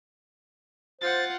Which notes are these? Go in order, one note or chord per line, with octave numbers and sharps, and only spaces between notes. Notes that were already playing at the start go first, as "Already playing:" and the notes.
F4 C5 F#5 A6